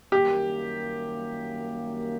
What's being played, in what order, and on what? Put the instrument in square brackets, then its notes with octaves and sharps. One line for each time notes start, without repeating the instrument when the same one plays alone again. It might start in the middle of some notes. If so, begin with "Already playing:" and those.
[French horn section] F#2 D#3 G3 A#3 [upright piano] G4